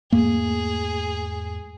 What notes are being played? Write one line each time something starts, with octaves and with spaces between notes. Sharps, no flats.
E2 G#2 A3 A#3 G#4